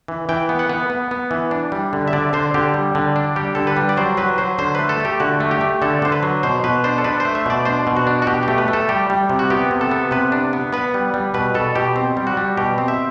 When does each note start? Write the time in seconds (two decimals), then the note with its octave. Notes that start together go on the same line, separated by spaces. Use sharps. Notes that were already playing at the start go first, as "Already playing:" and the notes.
0.08 E3
0.29 E3 G5
0.49 B3
0.59 F#5
0.69 B3
0.90 B3
1.11 B3
1.31 E3
1.51 D4
1.72 G3
1.93 D3
2.08 E5
2.13 D3 D5
2.33 D3 C5
2.54 D3 G4
2.74 G3
2.95 D3
3.16 D4
3.36 G3 G4
3.55 D3 A4
3.67 B4
3.77 G3
3.89 D5
3.97 F#3 C5
4.17 F#3 B4
4.38 F#3 C5
4.58 D3 C5
4.75 A3 B4
4.89 A4
5.00 A3 G4
5.20 D3 F#4
5.40 A3
5.51 G4
5.61 A3
5.82 D3 A4
6.02 D3 C5
6.12 B4
6.23 F#3
6.43 B2 C5
6.64 B2 B4
6.84 D4 C5
6.98 A4
7.04 D4 B4
7.20 C5
7.25 A3
7.35 E5
7.46 B2 D5
7.65 D4 C5
7.87 B2
7.97 F#4
8.07 D4
8.22 F#4
8.27 B2 G4
8.43 A3 G4
8.58 B4
8.68 A3
8.73 A4
8.89 G3 G4
9.10 G3
9.30 C3
9.39 F#4
9.50 B3 G4
9.71 C3
9.81 A4
9.91 B3
10.11 C3 B4
10.32 D4
10.53 B3
10.73 B3 B4
10.94 G3
11.14 G3
11.34 B2 B4
11.54 B2 A4
11.75 B2 G4
11.96 C4
12.17 G3
12.27 F#4
12.37 G3
12.57 B2 G4
12.78 C4
12.88 E5